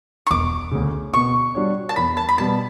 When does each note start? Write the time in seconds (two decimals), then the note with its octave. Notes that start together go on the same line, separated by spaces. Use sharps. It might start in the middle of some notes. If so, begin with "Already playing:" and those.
0.27 C#6
0.30 E1 D6
0.71 D2 C#3
1.13 B2 C#6
1.55 G3 D4 F#4 C#5
1.89 A5
1.96 E2 B5
2.17 A5
2.29 B5
2.38 B2 G3 B3 A5